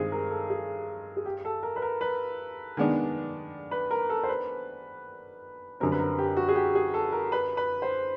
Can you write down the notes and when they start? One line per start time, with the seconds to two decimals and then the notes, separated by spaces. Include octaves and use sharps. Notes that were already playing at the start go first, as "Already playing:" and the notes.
Already playing: G2 D#3 G#3 C4 D#4 G#4
0.12 A#4
0.31 A4
0.50 G#4
1.17 G#4
1.25 G4
1.45 A4
1.63 A#4
1.76 B4
1.82 A#4
2.01 B4
2.77 D#3 G#3 B3 D4
3.71 B4
3.91 A#4
4.10 A4
4.24 C5
4.29 B4
5.80 F#2 D3 G3 C4 A#4
5.92 B4
5.99 A#4
6.18 G4
6.37 F#4
6.48 G#4
6.55 G4
6.75 G#4
6.94 A4
7.12 A#4
7.32 B4
7.57 B4
7.82 C5